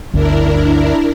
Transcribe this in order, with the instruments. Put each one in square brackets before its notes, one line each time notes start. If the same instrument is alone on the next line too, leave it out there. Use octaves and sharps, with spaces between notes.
[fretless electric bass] G1 D2 [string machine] D4 E4 A#4